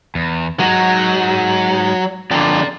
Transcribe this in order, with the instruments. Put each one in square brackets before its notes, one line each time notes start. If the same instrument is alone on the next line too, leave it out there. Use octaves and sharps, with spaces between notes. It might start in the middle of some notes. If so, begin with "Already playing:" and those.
[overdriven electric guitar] E2
[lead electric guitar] F#3 [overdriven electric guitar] G#3 D#4
[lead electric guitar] F2 D3 [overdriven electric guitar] D5 A#5